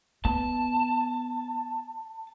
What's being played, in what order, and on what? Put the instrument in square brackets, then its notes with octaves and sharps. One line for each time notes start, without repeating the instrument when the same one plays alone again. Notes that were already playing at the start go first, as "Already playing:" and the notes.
[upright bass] B3 [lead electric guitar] A5